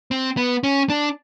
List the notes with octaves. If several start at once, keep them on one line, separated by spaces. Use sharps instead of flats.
C4
B3
C#4
D4